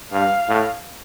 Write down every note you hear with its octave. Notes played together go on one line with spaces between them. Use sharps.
G2 F5
A2